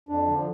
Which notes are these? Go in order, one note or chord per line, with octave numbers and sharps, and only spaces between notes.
F2 D4
D3 F3